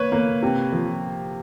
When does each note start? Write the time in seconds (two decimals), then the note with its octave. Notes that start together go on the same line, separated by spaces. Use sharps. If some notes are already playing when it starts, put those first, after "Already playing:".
Already playing: A#3 B4 C#5
0.12 A#3
0.42 C3
0.72 F3